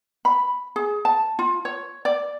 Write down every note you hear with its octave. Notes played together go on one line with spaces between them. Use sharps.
B5
G#4
A5
F4
C#5
D5